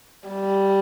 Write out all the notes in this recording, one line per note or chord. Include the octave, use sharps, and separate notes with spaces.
G3